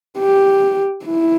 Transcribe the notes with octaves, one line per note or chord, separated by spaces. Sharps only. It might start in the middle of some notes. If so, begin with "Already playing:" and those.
G4
E4